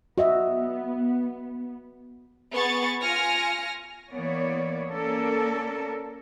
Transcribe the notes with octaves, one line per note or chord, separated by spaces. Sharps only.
B3 F#4 D#5 E5
B3 G#4 C#6 A6
F4 G#5 F6 A#6 C#7
E3 A#3 B3 C#5 D5
A#3 C#4 A4 A#4 D5